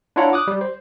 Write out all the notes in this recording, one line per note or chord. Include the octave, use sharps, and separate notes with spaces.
D4 E4 F4 C#5 F#5 A#5
D6 D#6 F#6
G3
C5